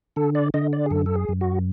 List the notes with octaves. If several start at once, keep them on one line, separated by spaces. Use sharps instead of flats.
D3 A4
D5
D3 D#5
D5
G#4
F#2 A4
A4
G#4
F#2
F#4